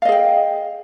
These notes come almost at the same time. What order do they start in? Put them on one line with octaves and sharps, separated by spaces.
F5 D#5 G#4 G5